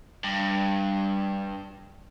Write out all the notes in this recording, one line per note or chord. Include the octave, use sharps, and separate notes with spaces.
G2